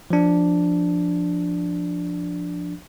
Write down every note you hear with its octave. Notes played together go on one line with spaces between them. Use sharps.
F3 D4